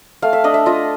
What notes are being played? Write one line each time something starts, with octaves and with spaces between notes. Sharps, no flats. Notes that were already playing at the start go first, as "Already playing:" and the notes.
A3 F5
E5
D4 D#5
E5
F4 D#5